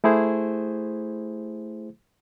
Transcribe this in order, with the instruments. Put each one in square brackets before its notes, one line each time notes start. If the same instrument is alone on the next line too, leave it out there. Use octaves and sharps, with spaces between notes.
[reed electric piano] A3 E4 G#4 C5